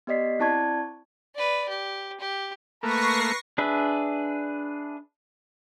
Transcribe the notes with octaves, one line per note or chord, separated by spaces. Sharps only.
B3 G4 D5 D#5 B6 C7
C4 E4 D5 A5 C#6 G#6
B4 D5
G4
G4
A3 A#3 B4 C#6 A#6 C7
D4 G#4 B4 E5